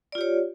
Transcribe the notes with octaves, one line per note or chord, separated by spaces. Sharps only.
F4 G4 C#5 D5